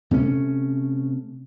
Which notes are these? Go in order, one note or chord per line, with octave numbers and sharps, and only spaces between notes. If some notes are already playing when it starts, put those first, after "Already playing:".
C3 A3 C#4